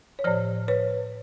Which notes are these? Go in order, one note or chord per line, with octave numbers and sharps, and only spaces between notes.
C#5
A2 F3 C5 D5
B4 C#5